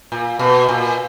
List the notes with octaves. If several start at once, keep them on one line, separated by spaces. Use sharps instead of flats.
A#2
B2
A#2